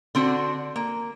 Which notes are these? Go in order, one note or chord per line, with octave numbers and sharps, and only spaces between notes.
D3 C4 D4 F#4
A#3